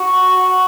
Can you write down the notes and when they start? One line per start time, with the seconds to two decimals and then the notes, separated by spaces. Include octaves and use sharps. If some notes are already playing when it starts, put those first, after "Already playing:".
Already playing: F#4
0.36 F#4